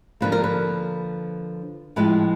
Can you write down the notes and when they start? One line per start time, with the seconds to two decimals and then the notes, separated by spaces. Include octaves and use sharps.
0.21 D3 F3 A#3 B4
0.32 A#4
0.44 B4
1.96 A2 F3 G#3 C4 B4